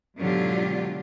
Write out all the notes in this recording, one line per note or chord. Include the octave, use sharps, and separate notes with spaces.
G#2 B2 D3 F#3 F4 G4